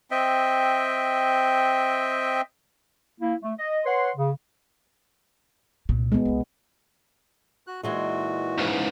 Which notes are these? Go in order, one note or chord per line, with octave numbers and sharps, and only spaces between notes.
C4 D#5 E5 G5
A#3 E4
A3
D#5
B4 C#5 F#5 C6
C#3
C2 A#2
G#3 B3
C2 B2
F#4 F#6
A#2 E3 G#3 D#4 F#4
C#2 G#2